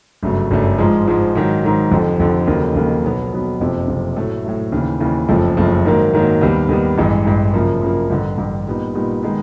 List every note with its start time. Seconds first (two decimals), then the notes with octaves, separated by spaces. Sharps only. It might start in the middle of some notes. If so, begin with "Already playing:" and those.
0.23 G1 F#2 C#3 F#3 A3
0.51 G1 F#2 C#3 F#3 A3
0.78 G#2 F3 G#3
1.07 G#2 F3 G#3
1.35 G#2 D#3 F#3
1.63 G#2 D#3 F#3
1.91 F1 F2 D3
2.20 F1 F2 D3
2.47 F1 D#2 C#3 F#3 A#3
2.75 F1 D#2 C#3 F#3 A#3
3.04 B1 B2 F#3 B3
3.32 B1 B2 F#3 B3
3.60 F#1 F2 C3
3.88 F#1 F2 C3
4.16 A2 F#3 A3
4.44 A2 F#3 A3
4.72 D#2 C#3 E3
5.00 D#2 C#3 E3
5.28 F#1 F2 C#3 F3 A3
5.57 F#1 F2 C#3 F3 A3
5.86 G#2 D#3 F#3 A#3
6.13 G#2 D#3 F#3 A#3
6.41 D#2 D#3 G3 B3
6.69 D#2 D#3 G3 B3
6.98 A1 G2 E3 G#3
7.25 A1 G2 E3 G#3
7.54 F#2 C#3 F3 A#3
7.82 F#2 C#3 F3 A#3
8.10 A1 G2 D3
8.38 A1 G2 D3
8.67 A#2 G3 B3 D#4
8.95 A#2 G3 B3 D#4
9.23 D#3 G#3 B3 D#4